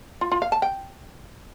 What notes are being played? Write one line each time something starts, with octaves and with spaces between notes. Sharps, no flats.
F4
F4
F5
A5
G5